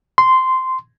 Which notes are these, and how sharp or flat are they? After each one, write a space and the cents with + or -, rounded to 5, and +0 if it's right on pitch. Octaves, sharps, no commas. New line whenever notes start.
C6 -10